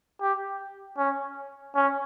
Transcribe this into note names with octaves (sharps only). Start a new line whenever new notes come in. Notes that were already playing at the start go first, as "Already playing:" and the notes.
G4
C#4
C#4